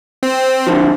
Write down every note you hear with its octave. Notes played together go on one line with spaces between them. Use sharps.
C4
D3 F3